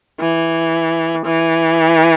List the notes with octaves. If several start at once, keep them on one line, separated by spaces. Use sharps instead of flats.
E3
E3